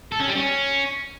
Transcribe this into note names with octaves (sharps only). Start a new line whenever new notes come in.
A4
C#4
G3
C#4